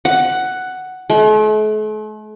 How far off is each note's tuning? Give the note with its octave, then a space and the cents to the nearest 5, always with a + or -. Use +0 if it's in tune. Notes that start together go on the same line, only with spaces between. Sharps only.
F#5 +5
A3 -45